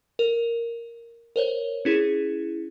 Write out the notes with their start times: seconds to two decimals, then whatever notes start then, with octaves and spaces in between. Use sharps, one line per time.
0.19 A#4
1.36 A#4 C5 C#5
1.85 C#4 E4 G#4